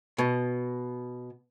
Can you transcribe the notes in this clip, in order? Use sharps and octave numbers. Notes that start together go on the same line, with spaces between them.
B2